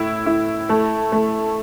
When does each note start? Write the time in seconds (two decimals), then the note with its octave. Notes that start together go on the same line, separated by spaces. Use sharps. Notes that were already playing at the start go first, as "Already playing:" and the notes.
Already playing: A2 E4
0.26 E4
0.69 A3
1.12 A3